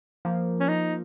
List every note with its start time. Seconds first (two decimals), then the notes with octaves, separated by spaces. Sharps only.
0.25 F3 A#3
0.60 C#4
0.68 D#4